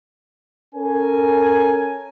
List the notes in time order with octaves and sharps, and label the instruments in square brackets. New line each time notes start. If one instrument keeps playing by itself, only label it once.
[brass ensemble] C#4 A4 A#4 G#5